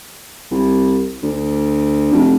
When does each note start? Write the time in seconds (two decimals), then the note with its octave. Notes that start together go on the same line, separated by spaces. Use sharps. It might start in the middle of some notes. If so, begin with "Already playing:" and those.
0.51 C2
1.23 D2
2.12 F1